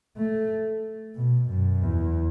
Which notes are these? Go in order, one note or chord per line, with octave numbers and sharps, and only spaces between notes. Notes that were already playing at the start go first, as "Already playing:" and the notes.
A3
B2
F#2
E2